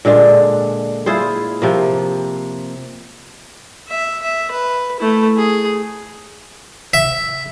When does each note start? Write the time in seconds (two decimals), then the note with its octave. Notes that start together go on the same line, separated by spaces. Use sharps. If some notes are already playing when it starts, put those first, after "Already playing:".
0.05 A#2 D3 G#3 D4
1.06 E4 F4 G#4 C5
1.62 C3 F3 A#3
3.88 E5
4.22 E5
4.51 B4
5.00 A3 E4
5.37 G#4
6.94 E5